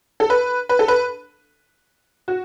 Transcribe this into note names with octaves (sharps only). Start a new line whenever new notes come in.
A4
B4
B4
A4
B4
F#4